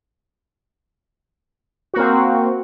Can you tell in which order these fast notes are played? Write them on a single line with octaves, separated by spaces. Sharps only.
F#4 A#3 C4